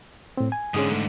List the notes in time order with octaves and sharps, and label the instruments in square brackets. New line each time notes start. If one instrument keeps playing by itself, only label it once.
[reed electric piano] A2 C4
G#5
[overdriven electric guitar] G#2 D3 [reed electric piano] C#4 G#4 D#6
[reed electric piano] A3